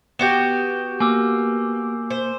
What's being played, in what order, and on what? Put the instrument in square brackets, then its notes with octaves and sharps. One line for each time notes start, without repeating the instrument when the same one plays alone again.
[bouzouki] B3 F#4 G4 [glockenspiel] G6 E7
[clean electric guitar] A#3 [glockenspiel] G#5 D6 E6
[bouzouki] C5